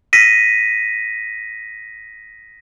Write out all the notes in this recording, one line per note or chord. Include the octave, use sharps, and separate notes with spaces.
A#6 B6 D#7